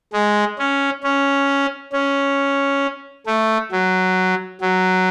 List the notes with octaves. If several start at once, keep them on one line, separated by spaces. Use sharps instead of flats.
G#3
C#4
C#4
C#4
A3
F#3
F#3